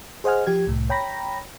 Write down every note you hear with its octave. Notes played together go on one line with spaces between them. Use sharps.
G#4 C5 D#5 F#5 G#5 F6
F3 G4 G#6
C2 A2
C#5 G5 A#5 B5 A#6